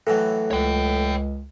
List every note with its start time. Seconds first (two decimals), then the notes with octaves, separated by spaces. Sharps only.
0.07 A2 E3 F#3 A4
0.51 C#2 C#5 G5